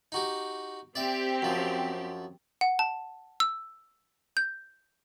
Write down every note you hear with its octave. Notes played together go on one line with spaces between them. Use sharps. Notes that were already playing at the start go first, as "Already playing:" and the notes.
D#4 F#4 G4
C4 G4 D5 E5
F#2 F3
F#5
A5
E6
G6